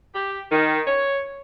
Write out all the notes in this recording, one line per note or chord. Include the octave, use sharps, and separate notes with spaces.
G4
D#3
C#5